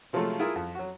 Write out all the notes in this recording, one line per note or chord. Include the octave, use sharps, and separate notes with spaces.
C3 F3 F#3 G#3 A3
E4 F4 G#4 A#4
F2
F#3 F#4